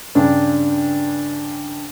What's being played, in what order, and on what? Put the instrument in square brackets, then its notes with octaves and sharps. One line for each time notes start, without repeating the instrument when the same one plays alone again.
[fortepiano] G2 C#3 D4